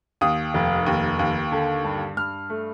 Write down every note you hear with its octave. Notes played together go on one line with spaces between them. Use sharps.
D#2 D#6
F1
D#2
D#2
D3
G2
G2 F6
A3